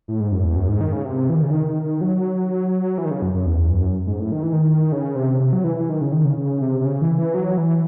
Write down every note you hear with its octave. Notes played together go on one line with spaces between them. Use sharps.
A2
G#2
F#2
E2
F#2
G#2
D#3
C#3
C3
E3
D#3
C#3
D#3
F#3
E3
D#3
C#3
F#2
F#2
E2
F#2
G#2
A2
D#3
E3
D#3
C#3
C3
C3
F#3
E3
E3
D#3
C#3
D#3
C#3
C#3
C3
C3
C#3
E3
E3
F#3
E3